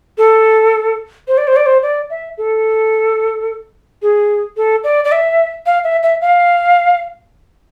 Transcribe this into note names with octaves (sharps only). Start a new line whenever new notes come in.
A4
C5
D5
C5
D5
C5
D5
E5
A4
G#4
A4
D5
D5
E5
F5
E5
E5
F5